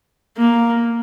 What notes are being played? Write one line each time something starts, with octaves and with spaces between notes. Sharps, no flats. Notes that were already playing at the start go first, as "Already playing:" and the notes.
A#3